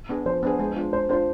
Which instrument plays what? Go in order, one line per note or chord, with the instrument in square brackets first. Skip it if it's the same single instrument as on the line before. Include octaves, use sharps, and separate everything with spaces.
[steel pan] B3 D4 G#4
[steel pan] F3 [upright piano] C5
[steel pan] B3 D4 G#4
G#3
D4 F4
[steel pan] G#3 [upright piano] C5
[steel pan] D4 F4 [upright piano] C5